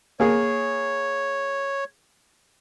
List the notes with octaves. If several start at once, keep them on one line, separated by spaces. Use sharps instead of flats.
A#3 G#4 C#5